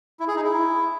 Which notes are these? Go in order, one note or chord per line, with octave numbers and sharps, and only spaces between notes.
E4
G#4
D#4
E4